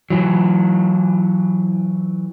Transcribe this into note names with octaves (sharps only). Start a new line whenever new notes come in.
E3 F#3